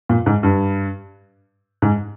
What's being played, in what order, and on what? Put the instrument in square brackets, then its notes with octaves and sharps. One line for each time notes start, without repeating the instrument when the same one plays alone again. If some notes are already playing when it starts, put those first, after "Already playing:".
[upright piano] A#2
G#2
G2
G#2